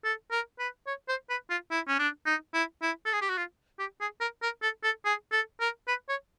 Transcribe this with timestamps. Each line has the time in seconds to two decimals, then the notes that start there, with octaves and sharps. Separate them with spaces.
0.04 A4
0.32 A#4
0.59 B4
0.87 C#5
1.09 C5
1.30 B4
1.50 F4
1.71 E4
1.88 C#4
1.99 D4
2.26 D#4
2.54 E4
2.82 E4
3.06 A4
3.13 G#4
3.22 G4
3.29 F#4
3.37 F4
3.79 G4
4.01 G#4
4.21 A#4
4.43 A#4
4.62 A4
4.84 A4
5.05 G#4
5.32 A4
5.60 A#4
5.88 B4
6.09 C#5